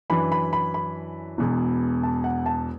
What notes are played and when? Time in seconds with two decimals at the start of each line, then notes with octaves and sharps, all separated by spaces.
0.10 F#2 E3 D4 B5
0.32 B5
0.53 B5
0.74 B5
1.38 E1 E2 B2
2.03 A5
2.24 F#5
2.46 A5